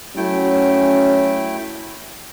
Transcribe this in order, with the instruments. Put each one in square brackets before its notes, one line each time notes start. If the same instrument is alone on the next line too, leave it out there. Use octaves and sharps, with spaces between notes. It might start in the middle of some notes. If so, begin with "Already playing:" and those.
[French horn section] F#3 C#4 [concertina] A3 E4 G5